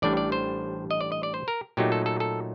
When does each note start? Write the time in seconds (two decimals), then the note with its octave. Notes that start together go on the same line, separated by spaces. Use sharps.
0.02 A1 A2 G3 D4 D5
0.17 D5
0.32 C5
0.91 D#5
1.01 D5
1.12 D#5
1.23 D5
1.34 C5
1.48 A#4
1.77 A#2 F#3 A3 D#4 G4
1.92 A4
2.06 A4
2.20 A4